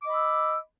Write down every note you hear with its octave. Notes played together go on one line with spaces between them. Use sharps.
D#5 B5 D6 E6